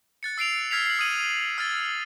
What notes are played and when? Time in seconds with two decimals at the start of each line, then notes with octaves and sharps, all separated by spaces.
0.23 F#6 A6 C#7
0.38 E6 C7 D7 F7
0.71 E6 F6 G#6 B6 C7 F7
0.86 C7 F#7
0.99 D#6 F6 G#6 D#7 F#7
1.58 E6 F6 G#6 A6